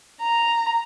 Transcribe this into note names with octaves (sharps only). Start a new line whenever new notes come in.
A#5